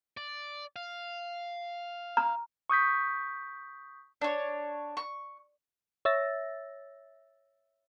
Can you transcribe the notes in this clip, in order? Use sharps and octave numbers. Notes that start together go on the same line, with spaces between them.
D5
F5
A#5 F6
C#6 D#6 G6 B6
D4 C#5
C#6
C#5 E5 E6 A6 A#6